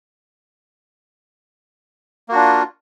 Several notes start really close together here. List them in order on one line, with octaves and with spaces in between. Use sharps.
A#3 F#4 D4 F4